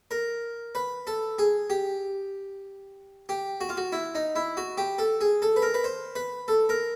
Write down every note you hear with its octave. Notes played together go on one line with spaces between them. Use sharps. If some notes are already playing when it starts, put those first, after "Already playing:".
A#4
B4
A4
G#4
G4
G4
F#4
F4
F#4
E4
D#4
E4
F#4
G4
A4
G#4
A4
B4
A#4
B4
C5
B4
A4
A#4